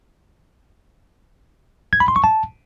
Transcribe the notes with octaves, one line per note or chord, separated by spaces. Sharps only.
G#6
B5
C6
C#6
A5